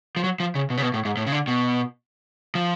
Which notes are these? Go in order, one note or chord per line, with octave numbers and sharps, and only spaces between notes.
F3
F#3
F3
C#3
B2
C#3
B2
A2
G#2
A2
C#3
D3
B2
F3